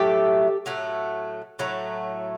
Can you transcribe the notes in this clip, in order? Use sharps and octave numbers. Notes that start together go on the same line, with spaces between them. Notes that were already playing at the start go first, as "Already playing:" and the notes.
Already playing: A2 F#3 A3 G4 A4
A2 F#3 A3
A2 F#3 A3